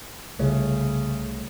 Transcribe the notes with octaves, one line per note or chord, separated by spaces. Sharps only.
C2 C#3 A3 C#5